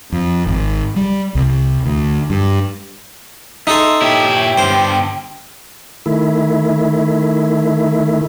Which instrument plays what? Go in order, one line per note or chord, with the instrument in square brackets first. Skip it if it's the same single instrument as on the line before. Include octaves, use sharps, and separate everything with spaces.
[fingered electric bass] F2
G#1
G3
C2
D2
G2
[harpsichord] D#4 A4 G#5 [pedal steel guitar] E5 C6
[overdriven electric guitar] A#2 E4 [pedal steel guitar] G4 C#5 E5 [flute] G5
[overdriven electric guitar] G2 D3 [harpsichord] C5
[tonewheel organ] D#3 A3 E4